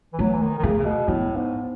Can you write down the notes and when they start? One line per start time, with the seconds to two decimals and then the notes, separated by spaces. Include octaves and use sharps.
0.13 E3
0.19 F#3 A3
0.34 E3
0.41 D#3
0.59 D#3
0.63 C#3 A3
0.78 C#3
0.85 B2
1.08 A2 B3
1.37 G#2